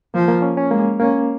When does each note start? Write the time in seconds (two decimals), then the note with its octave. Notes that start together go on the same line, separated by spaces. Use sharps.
0.14 F3 A#3
0.28 A#3
0.42 C#4
0.57 C#4
0.71 G#3 A#3
1.00 A#3 C#4